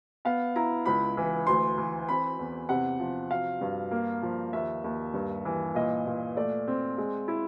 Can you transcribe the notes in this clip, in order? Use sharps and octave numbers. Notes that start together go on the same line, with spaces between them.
B3 F5
E4 A#5
C#2 B5
E3
D2 C6
E3
C4 B5
E2
C3 F#5
F3
F#3 F5
G2
A#3
F3
D#2 E5
D#2
G2
E3
A#2 D#5
A#2
A3 D5
C4
G#3
E4